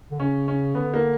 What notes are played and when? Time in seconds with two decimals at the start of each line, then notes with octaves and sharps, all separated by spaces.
0.11 D3
0.19 C#3 C#4
0.48 C#4
0.75 D3 B3
0.94 A#3